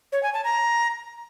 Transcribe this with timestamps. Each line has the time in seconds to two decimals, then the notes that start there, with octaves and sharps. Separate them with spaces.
0.12 C#5
0.23 G#5
0.34 A5
0.44 A#5